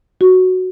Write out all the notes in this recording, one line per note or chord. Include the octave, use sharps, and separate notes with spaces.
F#4